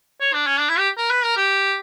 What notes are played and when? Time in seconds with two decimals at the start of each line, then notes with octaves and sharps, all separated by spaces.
0.20 C#5
0.34 D4
0.46 C#4
0.59 D4
0.69 E4
0.79 G4
0.98 A#4
1.10 B4
1.24 A#4
1.36 G4